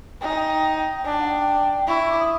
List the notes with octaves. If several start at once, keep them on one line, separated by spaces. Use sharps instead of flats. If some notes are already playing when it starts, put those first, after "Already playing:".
D#4 G5
G#5
G5
D4 G#5
G5
F#5
G5
E4 C#6
C#6
D6
D#6